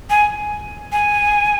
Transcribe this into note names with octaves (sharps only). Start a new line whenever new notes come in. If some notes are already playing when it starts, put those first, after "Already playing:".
G#5
G#5